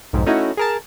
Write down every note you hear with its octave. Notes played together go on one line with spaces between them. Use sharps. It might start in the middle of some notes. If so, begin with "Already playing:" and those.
B1 F2 G#2
A3 C#4 D#4 E4 F#4
G#4 A#4 A5